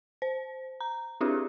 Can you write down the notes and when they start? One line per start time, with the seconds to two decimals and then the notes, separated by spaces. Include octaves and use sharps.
0.22 C5
0.80 A#5
1.21 C4 D4 E4 F4 G4 G#4